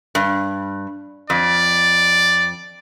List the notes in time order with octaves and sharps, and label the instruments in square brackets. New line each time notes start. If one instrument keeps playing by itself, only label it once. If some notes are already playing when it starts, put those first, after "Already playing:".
[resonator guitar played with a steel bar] G2
[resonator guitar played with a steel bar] F2 [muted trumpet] D5